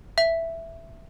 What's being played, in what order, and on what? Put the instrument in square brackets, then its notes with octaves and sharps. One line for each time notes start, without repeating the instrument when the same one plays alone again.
[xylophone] E5